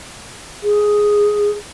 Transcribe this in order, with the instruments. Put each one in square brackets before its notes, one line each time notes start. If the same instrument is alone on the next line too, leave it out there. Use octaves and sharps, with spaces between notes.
[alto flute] G#4